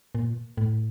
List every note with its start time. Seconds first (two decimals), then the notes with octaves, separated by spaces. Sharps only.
0.15 A#2
0.57 A2